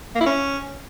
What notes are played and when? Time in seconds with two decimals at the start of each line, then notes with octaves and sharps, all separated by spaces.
0.15 A#3
0.20 E4
0.26 C#4